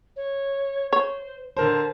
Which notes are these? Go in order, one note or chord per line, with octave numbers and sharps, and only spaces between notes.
C#5
C5 C#5
D3 A#4 C5 A5